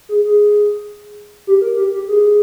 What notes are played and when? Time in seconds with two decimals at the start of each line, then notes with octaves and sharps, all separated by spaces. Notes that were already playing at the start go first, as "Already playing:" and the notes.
0.09 G#4
0.24 G#4
1.47 G4
1.61 A#4
1.77 G4
1.92 G4
2.08 G#4